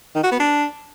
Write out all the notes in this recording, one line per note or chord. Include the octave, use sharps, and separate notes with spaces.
D#3
F#4
B3
D4